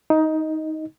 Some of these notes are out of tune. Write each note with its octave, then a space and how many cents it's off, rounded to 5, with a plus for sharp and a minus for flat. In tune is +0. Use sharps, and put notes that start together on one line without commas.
D#4 +15 D#5 +0